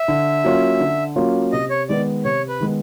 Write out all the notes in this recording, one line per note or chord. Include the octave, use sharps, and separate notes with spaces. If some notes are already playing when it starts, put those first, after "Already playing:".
Already playing: E5
D3
F#3 A#3 C#4 F4
D3
F#3 A#3 C#4 F4
C3 D#5
C#5
D#3 G#3 B3 D5
C3 C#5
B4
D#3 G#3 B3